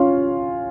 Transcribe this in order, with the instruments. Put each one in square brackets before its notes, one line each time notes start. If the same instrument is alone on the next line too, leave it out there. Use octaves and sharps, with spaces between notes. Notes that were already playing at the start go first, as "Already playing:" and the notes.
Already playing: [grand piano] C#4 F4